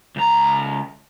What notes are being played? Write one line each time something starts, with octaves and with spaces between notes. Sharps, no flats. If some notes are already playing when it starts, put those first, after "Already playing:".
C#2 A#5